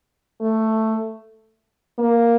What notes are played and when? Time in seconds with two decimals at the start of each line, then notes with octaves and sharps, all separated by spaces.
0.41 A3
1.99 A#3